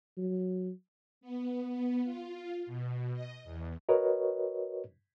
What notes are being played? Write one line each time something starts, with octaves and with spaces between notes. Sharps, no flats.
F#3
B3
B3
F4
B2
D#5
E2
F#4 A#4 B4 C#5 D#5